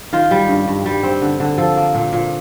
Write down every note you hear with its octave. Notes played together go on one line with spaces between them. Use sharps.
D#3 F4
G3
G2
G2
G3
C4
D3
D3
F3 A4
A#3
A#2
A#2